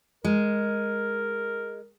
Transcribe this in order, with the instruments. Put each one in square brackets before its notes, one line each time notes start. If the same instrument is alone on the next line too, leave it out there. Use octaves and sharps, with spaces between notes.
[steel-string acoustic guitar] G#3 [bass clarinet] A#4